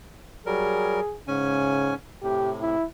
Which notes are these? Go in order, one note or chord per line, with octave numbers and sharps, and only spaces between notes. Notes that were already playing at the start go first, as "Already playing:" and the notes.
F#3 G3 G#4 A#4
G#2 C#3 C#4 G#5
A2 C3 G4
E4